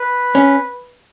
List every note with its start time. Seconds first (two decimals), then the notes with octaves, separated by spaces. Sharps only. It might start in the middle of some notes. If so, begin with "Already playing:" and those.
Already playing: B4
0.35 C#4